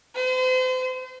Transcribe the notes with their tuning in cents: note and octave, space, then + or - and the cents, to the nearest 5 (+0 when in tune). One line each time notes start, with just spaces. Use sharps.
C5 -40